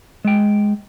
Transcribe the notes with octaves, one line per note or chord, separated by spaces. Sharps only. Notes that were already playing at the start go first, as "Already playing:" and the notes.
G#3 G5